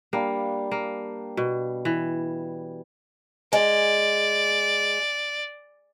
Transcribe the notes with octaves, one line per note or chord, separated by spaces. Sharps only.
G3 A#3 D4 F5
A#3
B2
E3
G#3 D5